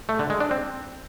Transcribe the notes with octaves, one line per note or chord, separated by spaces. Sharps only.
A3
D3
G#3
D4
C4